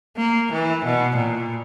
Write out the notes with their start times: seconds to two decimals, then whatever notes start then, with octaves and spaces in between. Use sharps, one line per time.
0.17 A#3
0.52 E3
0.85 B2
1.16 A#2